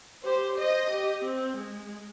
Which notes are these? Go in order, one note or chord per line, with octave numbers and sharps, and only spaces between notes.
G4 C5
C5 D#5
G4
C4
G#3